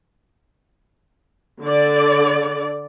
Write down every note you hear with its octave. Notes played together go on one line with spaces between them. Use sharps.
D3 D5